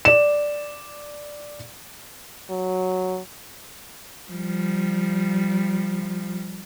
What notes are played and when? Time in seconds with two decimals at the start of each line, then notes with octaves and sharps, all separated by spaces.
0.05 D5 E7
2.50 F#3
4.30 F3 G3